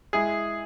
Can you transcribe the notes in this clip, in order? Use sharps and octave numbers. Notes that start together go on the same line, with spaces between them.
G#3 E4 G#4